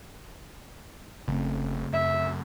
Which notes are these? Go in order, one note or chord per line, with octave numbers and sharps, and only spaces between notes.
F#1 C#3 A3 C4
F#2 E5